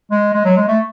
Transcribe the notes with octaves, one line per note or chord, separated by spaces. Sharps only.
G#3
G#3
F#3
G#3
A3